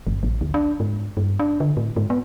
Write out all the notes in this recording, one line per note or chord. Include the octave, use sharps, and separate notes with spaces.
G1
A1
D2
D4
G#2
G2
D4
D3
A2
G#2
B3